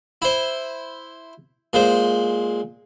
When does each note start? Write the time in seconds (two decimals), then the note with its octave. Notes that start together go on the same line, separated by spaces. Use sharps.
0.22 E4 C5
1.73 A#2 G#3 C5